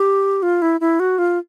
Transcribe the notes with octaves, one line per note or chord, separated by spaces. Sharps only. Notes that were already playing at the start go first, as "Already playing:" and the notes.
Already playing: G4
F4
E4
E4
F#4
F4